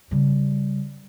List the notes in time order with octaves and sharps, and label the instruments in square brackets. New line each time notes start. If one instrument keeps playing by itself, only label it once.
[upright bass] C#3 G3